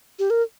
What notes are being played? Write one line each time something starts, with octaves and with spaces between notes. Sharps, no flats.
G4
A#4